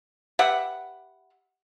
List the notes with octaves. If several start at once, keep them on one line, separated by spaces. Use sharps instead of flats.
G4 B4 E5 F#5